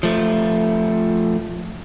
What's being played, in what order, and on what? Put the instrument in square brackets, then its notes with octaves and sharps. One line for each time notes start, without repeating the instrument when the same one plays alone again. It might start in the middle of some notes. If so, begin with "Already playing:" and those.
[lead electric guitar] F3 A3